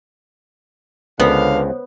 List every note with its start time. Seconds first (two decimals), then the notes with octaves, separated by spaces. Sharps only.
1.20 C#2 D3 B3 C5 C#5 F5